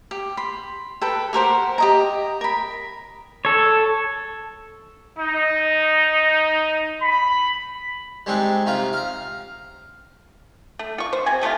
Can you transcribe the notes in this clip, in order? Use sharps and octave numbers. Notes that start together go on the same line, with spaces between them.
G4
B5 C6
A4 B4 G5
G4 A#4 C5 F#5
G4 D#5 A#5
A#4 B5
A4 C#5
D#4
B5
G3 G#3 C4 D4 D#4
C3 D#4 F4 A#5
F5 A#5
A3
F4 C#6
C5
C3 G#5
C3 A3 E4 F4